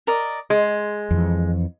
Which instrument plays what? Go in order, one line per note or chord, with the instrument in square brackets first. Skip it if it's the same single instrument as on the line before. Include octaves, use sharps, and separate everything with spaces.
[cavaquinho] A#4 D5 D#5
[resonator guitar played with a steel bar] G#3 [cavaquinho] C6
[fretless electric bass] F2 E3